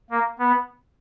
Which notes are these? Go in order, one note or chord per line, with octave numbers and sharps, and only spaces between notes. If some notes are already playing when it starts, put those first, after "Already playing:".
A#3
B3